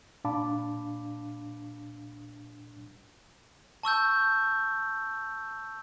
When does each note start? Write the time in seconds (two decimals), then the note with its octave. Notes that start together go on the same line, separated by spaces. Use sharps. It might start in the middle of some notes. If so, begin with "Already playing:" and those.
0.24 A#2 D4 F5 A5 B5 D6
3.83 A5 C#6 E6 G6